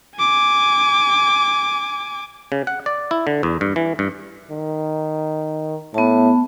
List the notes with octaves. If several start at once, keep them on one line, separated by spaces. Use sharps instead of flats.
G#5 D6
C#3
F#5
D5
E4
D3
E2
G2
E3
G2
D#3
A2 B3 A5